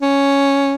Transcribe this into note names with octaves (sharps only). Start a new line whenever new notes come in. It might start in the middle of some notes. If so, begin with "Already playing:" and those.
C#4